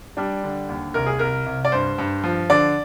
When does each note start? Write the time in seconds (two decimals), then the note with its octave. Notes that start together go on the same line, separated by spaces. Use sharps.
0.17 G3 D4
0.44 D3
0.69 D#2
0.94 C2 A#4
1.07 G#4
1.19 C2 A#4
1.46 C2
1.65 D5
1.72 G2 C5
1.98 G2
2.24 F3
2.50 D3 D5